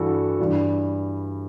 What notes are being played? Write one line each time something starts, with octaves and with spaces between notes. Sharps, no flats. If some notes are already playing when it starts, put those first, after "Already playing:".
Already playing: G2 E3 G3 F#4 A4
G2 E3 G3